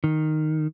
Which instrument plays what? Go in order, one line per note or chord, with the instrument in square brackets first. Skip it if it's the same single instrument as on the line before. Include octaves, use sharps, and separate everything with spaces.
[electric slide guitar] D#3